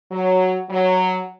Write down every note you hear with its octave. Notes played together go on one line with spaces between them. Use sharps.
F#3
F#3